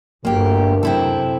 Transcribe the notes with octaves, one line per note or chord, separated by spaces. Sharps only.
G1 D2 G2 A#3 G4 A#4
F#2 C3 C4 E4 A4